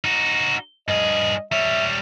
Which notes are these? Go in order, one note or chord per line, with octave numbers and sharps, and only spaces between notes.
D#4 F#4
G2 G#4 D#5
G3 C#5 E5